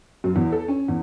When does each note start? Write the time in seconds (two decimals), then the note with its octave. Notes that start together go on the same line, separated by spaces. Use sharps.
0.24 F#2
0.36 E2
0.52 A4
0.68 C#4
0.88 E2